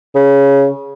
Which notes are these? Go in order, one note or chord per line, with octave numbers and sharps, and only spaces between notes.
C#3